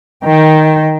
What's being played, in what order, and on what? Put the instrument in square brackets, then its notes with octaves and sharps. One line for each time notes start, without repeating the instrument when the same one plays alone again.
[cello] D#3 G5